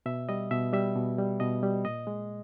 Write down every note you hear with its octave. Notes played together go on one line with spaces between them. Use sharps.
B2 E5
G3 D#5
B2 E5
G3 E5
B2
G3
B2 D#5
G3
A#2 D#5
G#3